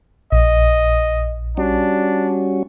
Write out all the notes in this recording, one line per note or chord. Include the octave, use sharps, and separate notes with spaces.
A#1 D#5
G3 C#4 D4 F#4